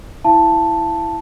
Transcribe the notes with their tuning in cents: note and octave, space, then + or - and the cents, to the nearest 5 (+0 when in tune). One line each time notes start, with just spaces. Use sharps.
E4 +0 F5 -45 A5 +0